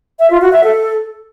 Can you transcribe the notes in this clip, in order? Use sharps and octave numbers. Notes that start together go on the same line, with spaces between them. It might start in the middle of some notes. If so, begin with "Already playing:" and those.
E5
F4
F#4
E5
A4